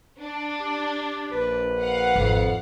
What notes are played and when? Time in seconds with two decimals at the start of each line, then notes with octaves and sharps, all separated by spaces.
0.19 D4
0.60 G4
1.31 A#1 B4
1.79 F5 F#5
2.16 G#1 F2